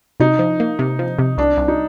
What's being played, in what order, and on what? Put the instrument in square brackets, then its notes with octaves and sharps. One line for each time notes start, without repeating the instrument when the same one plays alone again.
[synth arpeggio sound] C3 [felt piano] D#4
[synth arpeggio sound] F3
A#3
C3
F3
C3
[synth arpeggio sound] C2 [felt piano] D4
[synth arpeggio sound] C2
[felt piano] D#4